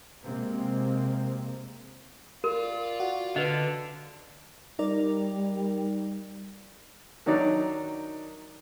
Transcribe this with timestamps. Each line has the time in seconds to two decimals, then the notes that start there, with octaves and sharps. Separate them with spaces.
0.23 C3 G#3 A#3 C4
2.44 F4 A#4 D5
3.00 F#4
3.36 D3 B4 D#5
4.79 G3 D#4 A#4 D5
7.26 D#3 F#3 D4 D#4 D5